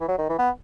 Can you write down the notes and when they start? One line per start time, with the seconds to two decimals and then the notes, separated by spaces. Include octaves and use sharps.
0.01 E3
0.08 F#3
0.18 D#3
0.29 E3
0.39 B3